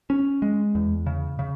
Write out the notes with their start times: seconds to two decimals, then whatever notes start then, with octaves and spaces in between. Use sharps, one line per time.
0.10 C#4
0.42 G#3
0.75 E2
1.06 C#3
1.39 C#3